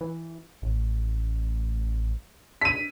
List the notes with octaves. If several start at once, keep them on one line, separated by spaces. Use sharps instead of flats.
E3
A1
D4 B6 D#7